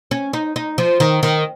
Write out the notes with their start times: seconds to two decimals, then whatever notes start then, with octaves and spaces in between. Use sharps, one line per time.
0.11 C#4
0.33 D#4
0.56 D#4
0.78 F3
1.00 D#3
1.23 D#3